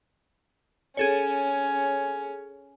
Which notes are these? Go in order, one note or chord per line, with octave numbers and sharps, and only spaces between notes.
C#4 G#4 A4 C#5